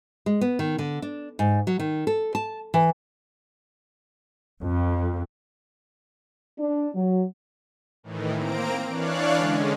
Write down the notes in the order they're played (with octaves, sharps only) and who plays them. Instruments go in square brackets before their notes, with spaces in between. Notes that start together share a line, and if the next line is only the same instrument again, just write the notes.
[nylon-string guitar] G#3
B3
D#3
D3
D4
G#2
F#3
D#3
A4
A5
E3
[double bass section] F2
[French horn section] D4
F#3
[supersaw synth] A2 D#3 E3
A#3 C4 A#5 D7
E3 D4 C#5 D5 F5 F#6
D3 G#3 C#4